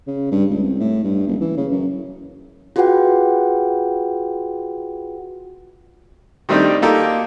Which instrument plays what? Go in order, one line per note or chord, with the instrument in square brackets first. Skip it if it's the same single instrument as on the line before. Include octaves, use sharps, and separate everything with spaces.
[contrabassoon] C#3
G2
C#2
C2
A2
G2
F#1
E3
C#3
F#2
[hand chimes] F4 F#4 G#4 B4 F#5 G5
[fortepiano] D#3 G3 A3 C4 D4 D#4
A#3 D#4 F4 G4 A4